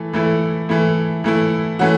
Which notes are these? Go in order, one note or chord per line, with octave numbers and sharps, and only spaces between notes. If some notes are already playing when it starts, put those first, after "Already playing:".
Already playing: E3 A3
E3 A3 E4
E3 A3 E4
E3 A3 E4
E3 A3 C#4 F#4